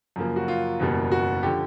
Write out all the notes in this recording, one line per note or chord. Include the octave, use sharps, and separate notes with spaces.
F#2 C#3 F3 A#3
F#4
F4
F#1 E2 B2 G3 A#3
F#4
D3 F3 G4